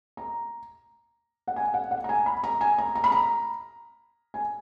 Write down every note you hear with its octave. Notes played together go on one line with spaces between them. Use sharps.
A#5
F#5
G#5
F#5
F#5
A#5
G#5
B5
A#5
G#5
A#5
A#5
B5
A#5
G#5